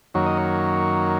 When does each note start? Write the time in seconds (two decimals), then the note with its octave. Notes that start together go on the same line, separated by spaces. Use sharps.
0.14 F#2 D#3 F#3 A#3 C#5
0.26 D#5
0.38 C#5